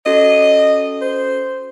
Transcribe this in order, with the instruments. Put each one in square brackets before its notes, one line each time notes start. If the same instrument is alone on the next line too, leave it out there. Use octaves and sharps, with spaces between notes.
[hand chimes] C#4 F#4 A4 [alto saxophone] D#5
[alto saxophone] C5